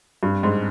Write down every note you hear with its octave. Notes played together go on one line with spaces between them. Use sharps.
G2
G#2